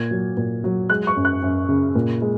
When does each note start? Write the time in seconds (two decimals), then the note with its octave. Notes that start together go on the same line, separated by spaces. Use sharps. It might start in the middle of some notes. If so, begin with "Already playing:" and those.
Already playing: A#2 G#6
0.11 F#3
0.37 A#2
0.64 F#3
0.90 G#3 F#6
1.07 C#6
1.17 F#2
1.25 F#6
1.43 F#2
1.69 C#3
1.95 A#2
2.21 G#3